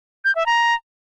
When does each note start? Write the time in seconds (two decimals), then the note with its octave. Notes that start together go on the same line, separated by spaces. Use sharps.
0.25 G6
0.35 E5
0.46 A#5